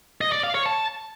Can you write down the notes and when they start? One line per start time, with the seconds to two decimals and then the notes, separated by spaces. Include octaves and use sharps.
0.21 D#5
0.32 D5
0.43 F5
0.55 C#5
0.66 A5